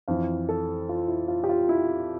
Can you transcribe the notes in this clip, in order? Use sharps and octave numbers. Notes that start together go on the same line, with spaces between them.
F2 E3 F5
A4
F4
E4
F4
G4
F4
E4